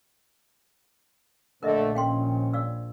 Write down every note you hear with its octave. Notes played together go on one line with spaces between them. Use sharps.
A#1 D3 A3 A#4 D#5 E5
D#3 C#4 F5 G5 C6
D5 F5 E6